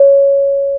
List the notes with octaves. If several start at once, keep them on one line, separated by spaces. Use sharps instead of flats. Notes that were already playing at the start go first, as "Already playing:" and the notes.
Already playing: C#5